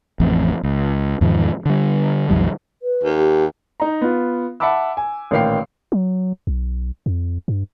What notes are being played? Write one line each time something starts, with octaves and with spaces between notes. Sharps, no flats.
A1 F2
C#2
E2 G#2 D#3 F3
D3 G3
B1 F2 D#3 G3
B4
D#2
G4
D#4 A#5
B3 F4
E5 F#5 A5 B5 D6 E6
G#5
A1 A#2 D#3 F5 G5 C7
F#3
B1
F2
G2